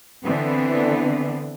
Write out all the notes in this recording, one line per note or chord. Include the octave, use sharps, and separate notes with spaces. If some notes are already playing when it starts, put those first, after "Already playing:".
D3 E3 B3 C4